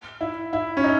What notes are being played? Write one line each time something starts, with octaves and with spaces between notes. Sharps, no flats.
E4
E4
C#4
D#4